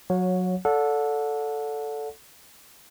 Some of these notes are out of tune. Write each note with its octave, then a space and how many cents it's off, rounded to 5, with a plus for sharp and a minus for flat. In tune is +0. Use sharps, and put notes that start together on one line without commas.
F#3 -15 C#5 +0 F#5 -35
A4 +0 D5 -25 F#5 -35